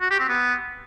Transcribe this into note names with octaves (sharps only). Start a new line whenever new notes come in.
F#4
G4
C4
B3